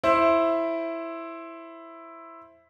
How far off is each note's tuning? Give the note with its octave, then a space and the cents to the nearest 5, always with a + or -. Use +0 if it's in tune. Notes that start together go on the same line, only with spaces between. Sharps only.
E4 +5 C5 +10